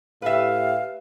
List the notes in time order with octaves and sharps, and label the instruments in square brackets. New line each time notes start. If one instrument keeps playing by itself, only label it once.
[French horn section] A2 G4 [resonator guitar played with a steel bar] B4 E5 [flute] F5